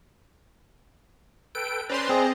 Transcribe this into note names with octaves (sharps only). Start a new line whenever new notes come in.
A4 B4 G5 D7
C#4 B4 C5 D5 A#5 C6
C4 G#4 C5 D5 D#5 A#5